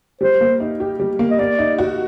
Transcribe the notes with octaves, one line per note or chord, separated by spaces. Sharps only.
G3 C5
A#3
D#4
G4
G3
A#3
D#5
A#3 D5
D#4
F#4